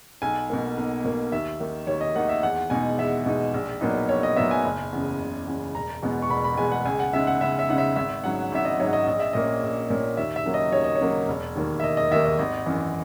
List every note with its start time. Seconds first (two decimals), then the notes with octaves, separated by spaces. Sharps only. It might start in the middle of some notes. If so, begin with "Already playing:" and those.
0.22 B1 G#5
0.50 B2 A#3
0.78 B1
1.05 B2 A#3
1.32 D#2 E5
1.60 D#3 A#3 D#4
1.87 D#2 C#5
2.01 D#5
2.15 D#3 A#3 D#4 F#5
2.29 E5
2.43 E2 F#5
2.70 B2 G#3 D#4 G#5
2.98 E2 E5
3.26 B2 G#3 D#4
3.54 A#1
3.81 A#2 F#3 B3 D#4
4.09 A#1 C#5
4.23 D#5
4.36 A#2 F#3 B3 D#4 E5
4.51 G#5
4.64 F#1
4.92 E2 C#3
5.20 F#1
5.47 E2 C#3
5.75 E1 A#5
6.02 E2 B2 G#3 B3
6.22 C#6
6.30 E1 B5
6.44 B5
6.57 E2 B2 G#3 B3 G#5
6.72 F#5
6.85 C#2 G#5
7.00 F#5
7.13 C#3 G#3 D#4 E5
7.27 F#5
7.41 C#2 E5
7.59 E5
7.69 C#3 G#3 D#4 F#5
7.78 E5
7.96 G#1 E5
8.24 G#2 F#3 C#4 F#5
8.52 G#1 E5
8.65 D#5
8.80 G#2 F#3 C#4 C#5
8.93 D#5
9.07 A#1 D#5
9.20 E5
9.33 A#2 A#3 C#4 D#5
9.63 A#1
9.90 A#2 A#3 C#4
10.17 D#2 E5
10.36 E5
10.45 C#3 F#3 A#3 C#4
10.54 D#5
10.72 D#2 C#5
10.84 D#5
10.95 C#5
11.01 C#3 F#3 A#3 C#4
11.28 E1
11.55 D#2 D#3 A#3
11.80 E5
11.83 E1 D#5
11.97 D#5
12.11 D#2 D#3 A#3 E5
12.25 D#5
12.39 G#1 D#5
12.66 F#2 E3